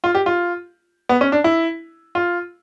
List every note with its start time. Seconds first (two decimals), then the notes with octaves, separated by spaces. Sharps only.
0.04 F4
0.15 G4
0.26 F4
1.09 B3
1.21 C#4
1.32 D4
1.44 E4
2.15 F4